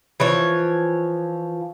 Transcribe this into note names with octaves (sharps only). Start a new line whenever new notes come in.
E3 F3 C#5